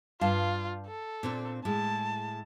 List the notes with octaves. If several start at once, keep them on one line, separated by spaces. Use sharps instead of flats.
G2 F4 F5 A5
A4
A#2 C4 D4
A2 G#3 A5